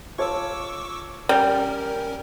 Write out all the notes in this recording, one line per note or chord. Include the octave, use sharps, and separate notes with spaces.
F4 A4 C#5 C#6 D6 E6
G3 C#4 A#4 G5 A#5